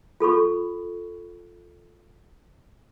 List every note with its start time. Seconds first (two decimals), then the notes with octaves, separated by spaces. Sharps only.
0.20 F4 A4 B5 C#6